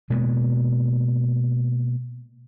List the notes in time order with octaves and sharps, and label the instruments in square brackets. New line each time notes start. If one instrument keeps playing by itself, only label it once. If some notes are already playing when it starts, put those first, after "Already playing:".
[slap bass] B2 G#3 A#3 B3